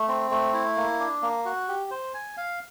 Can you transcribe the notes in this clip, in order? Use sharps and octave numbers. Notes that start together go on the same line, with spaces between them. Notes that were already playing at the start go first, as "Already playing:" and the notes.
Already playing: A3
C4
A3
E4
A#3
D4
A#3
F#4
G4
C5
G#5
F5